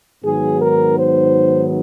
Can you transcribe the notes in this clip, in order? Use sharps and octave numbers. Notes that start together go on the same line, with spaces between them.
G#2 D#3 F#3 B3 G#4
A#4
C5